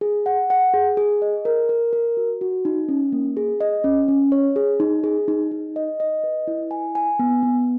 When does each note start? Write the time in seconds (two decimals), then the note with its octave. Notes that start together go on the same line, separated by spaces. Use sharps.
0.01 G#4
0.26 F#5
0.50 F#5
0.74 G#4
0.97 G#4
1.22 D#5
1.45 A#4
1.69 A#4
1.93 A#4
2.17 F#4
2.41 F#4
2.65 D#4
2.89 C#4
3.12 A#3
3.37 G#4
3.61 D#5
3.84 C#4
4.08 C#4
4.32 C#5
4.56 G#4
4.80 D#4
5.04 G#4
5.28 D#4
5.51 D#4
5.76 D#5
6.00 D#5
6.24 B4
6.47 E4
6.71 G#5
6.95 G#5
7.19 B3
7.43 B3